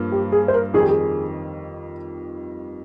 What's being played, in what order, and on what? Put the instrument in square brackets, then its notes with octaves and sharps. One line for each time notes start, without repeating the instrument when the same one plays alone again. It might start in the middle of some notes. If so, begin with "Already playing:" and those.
Already playing: [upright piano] G2 F3 A#3
[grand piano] G4
G#4
C5
A#4
[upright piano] F2 D#3 G3 [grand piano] G#4
[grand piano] G4
G#4